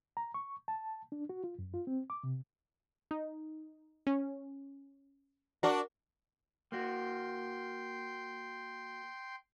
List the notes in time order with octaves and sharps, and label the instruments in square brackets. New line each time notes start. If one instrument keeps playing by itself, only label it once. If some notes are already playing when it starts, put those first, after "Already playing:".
[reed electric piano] A#5
C#6
A5
D4
F#4
F4
F#2
F4
C4
D6
C3
[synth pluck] D#4
C#4
[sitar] D4 F#4 [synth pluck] A#4
[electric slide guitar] A#3 F#4 [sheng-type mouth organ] G5 C6